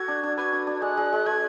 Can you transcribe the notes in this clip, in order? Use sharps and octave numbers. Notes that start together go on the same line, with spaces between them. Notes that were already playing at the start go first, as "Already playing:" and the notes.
Already playing: F#4 A4 G#6
D4
D4
B4 G#6
D4
D4
G#3 F#6
G#3
G#3
G#3 G#6